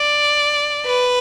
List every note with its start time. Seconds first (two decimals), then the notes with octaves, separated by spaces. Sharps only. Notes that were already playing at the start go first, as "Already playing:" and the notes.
Already playing: D5
0.86 B4